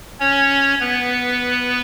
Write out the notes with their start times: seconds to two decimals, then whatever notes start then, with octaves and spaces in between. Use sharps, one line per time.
0.20 C#4 C#5
0.80 B3 B4